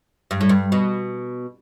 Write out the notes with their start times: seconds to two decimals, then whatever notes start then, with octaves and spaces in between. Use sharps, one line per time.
0.31 G2
0.41 A2
0.49 G2
0.72 B2